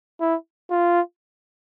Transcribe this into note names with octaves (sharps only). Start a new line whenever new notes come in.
E4
F4